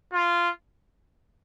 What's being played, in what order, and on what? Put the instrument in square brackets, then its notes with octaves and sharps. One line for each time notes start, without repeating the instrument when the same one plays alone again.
[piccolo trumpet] F4